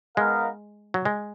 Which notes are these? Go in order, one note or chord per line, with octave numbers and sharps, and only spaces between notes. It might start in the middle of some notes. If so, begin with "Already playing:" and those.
G#3 B3 D#4 A#4 F5
F#3
G#3